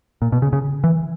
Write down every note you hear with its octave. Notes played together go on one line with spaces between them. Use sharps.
A#2
B2
C#3
C#3
E3